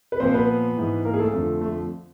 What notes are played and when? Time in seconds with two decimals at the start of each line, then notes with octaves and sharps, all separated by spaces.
0.12 B4
0.20 A#2 F3 C4 C5
0.34 B3 B4
0.77 G#2 E3
1.05 A#3 A#4
1.14 G#4
1.19 A3 A4
1.33 F2 D3 F3
1.61 A3